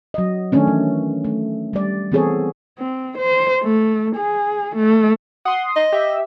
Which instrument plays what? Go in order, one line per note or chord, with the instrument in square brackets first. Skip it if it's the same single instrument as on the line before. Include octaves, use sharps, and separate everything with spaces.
[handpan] F#3 D#5
D#3 A3 C#4 D4
E3
A3
G3 D5
E3 B3 C4 G#4 A4 C#5
[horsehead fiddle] C4
C5
A3
G#4
A3
[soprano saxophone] F#5 [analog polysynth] C6 D#6
[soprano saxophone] D#5
[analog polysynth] G4 E5